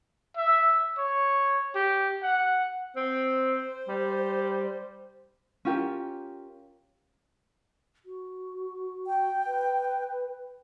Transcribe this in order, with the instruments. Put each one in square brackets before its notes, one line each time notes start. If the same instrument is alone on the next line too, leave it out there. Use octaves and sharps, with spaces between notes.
[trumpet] E5
C#5
G4
F#5
[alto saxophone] C4 [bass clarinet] C5
[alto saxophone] G3
[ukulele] C#4 F4 G4 A#4
[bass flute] F#4
[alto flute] G5
[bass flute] B4